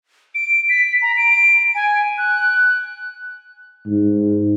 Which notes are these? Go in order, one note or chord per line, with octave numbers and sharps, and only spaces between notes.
D7
B6
A#5
D7
G#5
F#6
G#2